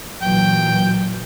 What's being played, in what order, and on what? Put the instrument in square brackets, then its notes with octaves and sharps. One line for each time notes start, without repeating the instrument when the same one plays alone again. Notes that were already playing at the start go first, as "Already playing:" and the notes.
[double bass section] A#2 E3 F#3 [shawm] G5